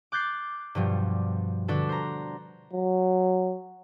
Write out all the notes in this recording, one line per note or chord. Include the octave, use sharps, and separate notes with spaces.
D6 F#6 G6 A6 C7
G2 B2 F3 G3
D3 D4 F#4 A4 B4
C5 A#5
F#3